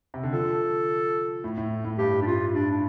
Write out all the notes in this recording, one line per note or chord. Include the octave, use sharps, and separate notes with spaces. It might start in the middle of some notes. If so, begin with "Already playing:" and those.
C3
D3
F3 A4
A2
A2
A2
G2 G4
D4
F4
D4
D4